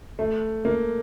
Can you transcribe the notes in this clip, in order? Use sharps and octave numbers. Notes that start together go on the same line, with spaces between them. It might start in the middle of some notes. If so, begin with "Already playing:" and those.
A3
A#3